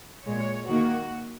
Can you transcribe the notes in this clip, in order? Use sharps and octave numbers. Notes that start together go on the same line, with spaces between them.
A#2 G#3 C#5
D#3 A#3 F#4